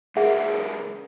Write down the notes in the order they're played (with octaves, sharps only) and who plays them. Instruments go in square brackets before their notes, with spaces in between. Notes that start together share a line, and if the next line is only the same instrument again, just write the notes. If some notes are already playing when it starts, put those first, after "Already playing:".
[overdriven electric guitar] C#2 A#3 [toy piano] G#4 E5 F#5